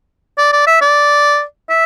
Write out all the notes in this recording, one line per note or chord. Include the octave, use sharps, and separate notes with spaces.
D5
D5
E5
D5
E5